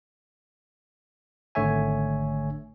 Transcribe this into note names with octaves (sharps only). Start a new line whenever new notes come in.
G#1 D3 A3 C#5 E5 G#5